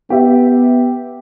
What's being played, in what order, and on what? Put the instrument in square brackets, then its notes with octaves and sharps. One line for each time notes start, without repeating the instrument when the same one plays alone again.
[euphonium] B3 [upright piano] G4 E5